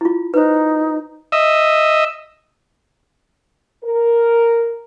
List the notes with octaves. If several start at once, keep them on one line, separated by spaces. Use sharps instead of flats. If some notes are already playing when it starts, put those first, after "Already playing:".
E4 F4
D#4 B4 C5
D#5 E5
A#4